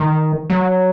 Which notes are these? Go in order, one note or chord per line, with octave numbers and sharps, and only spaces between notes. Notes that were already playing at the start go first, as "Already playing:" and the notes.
Already playing: D#3
F#3